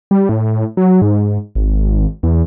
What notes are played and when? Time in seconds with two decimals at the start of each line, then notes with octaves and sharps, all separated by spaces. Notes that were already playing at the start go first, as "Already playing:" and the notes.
0.11 G3
0.29 A2
0.77 F#3
1.02 G#2
1.56 G#1
2.23 E2